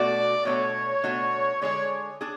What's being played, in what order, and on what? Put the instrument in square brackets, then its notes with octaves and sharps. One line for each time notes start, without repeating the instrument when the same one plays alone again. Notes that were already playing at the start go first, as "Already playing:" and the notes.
Already playing: [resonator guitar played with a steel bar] B2 A3 D4 F#4 [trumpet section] D5
[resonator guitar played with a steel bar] B2 A3 D4 F#4 [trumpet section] C#5
[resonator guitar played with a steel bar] B2 A3 D4 F#4
[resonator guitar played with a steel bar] D3 G#3 D4 G#4 D5 [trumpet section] C#5
[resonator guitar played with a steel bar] D4 G#4 D5